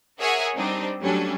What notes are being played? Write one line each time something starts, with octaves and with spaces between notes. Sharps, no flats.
G#4 A#4 C#5 E5 F#5 G#5
G3 C4 D4 D#4
F#3 G3 A3 C#4 D4